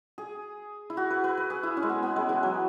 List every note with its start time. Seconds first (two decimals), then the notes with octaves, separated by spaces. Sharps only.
0.18 G#4
0.90 E4
0.97 F#4
1.10 B4
1.24 B4
1.37 B4
1.50 G#4
1.63 E4
1.77 C#4
1.83 G#3
1.89 B3
2.03 B3
2.16 G#3
2.29 E3
2.43 F#3